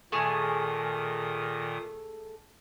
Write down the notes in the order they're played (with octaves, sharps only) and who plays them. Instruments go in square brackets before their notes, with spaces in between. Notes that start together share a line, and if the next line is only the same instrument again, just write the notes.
[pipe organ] A#2 D#3 D#6 [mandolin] A3 G#4